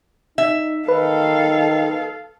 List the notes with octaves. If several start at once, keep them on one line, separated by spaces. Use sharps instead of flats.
D#4 E5
D#3 A4 B4 F5